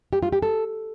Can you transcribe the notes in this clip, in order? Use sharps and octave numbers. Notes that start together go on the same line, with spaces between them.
G4
F4
G4
A4